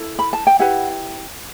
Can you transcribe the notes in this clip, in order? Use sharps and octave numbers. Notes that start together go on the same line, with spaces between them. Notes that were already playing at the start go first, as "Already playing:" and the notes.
Already playing: E4 A4
B5
A5
G5
E4 G4 B4 F#5